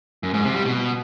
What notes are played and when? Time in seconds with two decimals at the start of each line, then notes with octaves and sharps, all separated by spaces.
0.23 F#2
0.34 G#2
0.44 C3
0.54 G3
0.65 B2